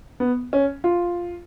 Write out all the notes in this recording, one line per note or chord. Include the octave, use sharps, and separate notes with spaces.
B3
C#4
F4